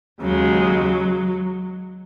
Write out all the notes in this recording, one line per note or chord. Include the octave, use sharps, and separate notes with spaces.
D#2 C#3 F#3 G#3